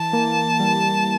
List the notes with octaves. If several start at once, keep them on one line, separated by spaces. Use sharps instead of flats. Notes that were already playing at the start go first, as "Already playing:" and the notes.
Already playing: E3 A5
A#3
G3